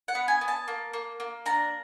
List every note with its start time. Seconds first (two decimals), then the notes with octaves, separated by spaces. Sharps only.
0.08 F#5
0.15 B3
0.28 G#5
0.41 B3
0.48 A5
0.68 A#3
0.93 A#3
1.20 A#3
1.46 D4 A#5